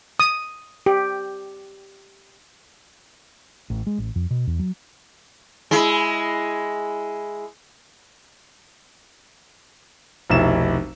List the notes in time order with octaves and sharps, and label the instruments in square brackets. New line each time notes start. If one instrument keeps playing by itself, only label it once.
[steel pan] D#6
G4
[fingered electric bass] A1
G#3
A1
F2
B2
E2
F#3
[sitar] G#3 E4
[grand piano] F1 B1 E4 E7